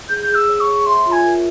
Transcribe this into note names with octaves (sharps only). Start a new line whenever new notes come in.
G#4 G6
G#4
E6
C#5
C#6
C#5
E5 C6
F4
G#5
A#4